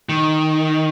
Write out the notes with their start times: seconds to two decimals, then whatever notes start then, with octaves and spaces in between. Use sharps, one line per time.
0.09 D#3